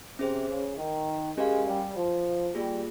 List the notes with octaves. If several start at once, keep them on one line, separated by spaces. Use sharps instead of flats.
C3 C#4 G#4 C5
C#3
D#3
G#3 C#4 G4 A#4 F5 G#5
G3
F3
G3 A#3 F4 G#4